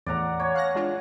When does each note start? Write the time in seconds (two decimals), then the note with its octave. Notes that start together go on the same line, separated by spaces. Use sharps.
0.06 E2 A2 D5 F#5 A#5
0.40 C#5 G#5
0.54 F5 F#6 A#6
0.75 G#3 D4 F4